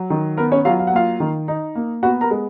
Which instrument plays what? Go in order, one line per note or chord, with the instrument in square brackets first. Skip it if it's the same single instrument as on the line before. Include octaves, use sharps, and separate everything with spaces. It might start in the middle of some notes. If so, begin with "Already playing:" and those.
Already playing: [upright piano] F#3
D#3
B3 A#4
C#4 C#5
F#3 F4 F5
F5
F#5
A#3 F4 F5
D#3
D#4
A#3
B3 F#4 F#5
A#4 A#5
G#3